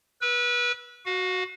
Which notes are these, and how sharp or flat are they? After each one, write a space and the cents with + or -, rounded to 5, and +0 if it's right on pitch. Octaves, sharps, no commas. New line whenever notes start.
B4 -25 E6 +0
F#4 +0 F5 +40